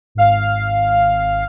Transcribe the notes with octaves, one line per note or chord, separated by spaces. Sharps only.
G#1 F5